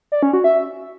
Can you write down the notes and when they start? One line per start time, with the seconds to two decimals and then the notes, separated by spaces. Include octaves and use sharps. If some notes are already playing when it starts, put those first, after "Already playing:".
0.12 D5
0.23 C#4
0.33 F#4
0.44 E5